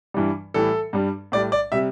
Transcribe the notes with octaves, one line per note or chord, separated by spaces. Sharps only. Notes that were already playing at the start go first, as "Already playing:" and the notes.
G2 E3 G3
A2 E3 G3 A4
G2 G3
A2 G3 D5
D5
C3 G3 E5